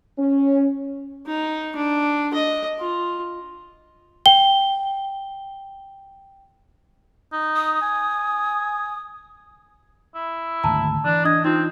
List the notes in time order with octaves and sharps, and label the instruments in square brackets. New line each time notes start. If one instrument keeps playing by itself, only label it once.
[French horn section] C#4
[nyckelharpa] D#4
D4
D#5
F4
[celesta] G5 G7
[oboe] D#4
[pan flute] D#6
[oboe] G#5
[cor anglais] E4
[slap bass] G#1 D2 [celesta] A5 A#5
[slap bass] E3 [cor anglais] D4
[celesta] D4 G#6 [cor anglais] D#5
[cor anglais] C4 [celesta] D#4 F4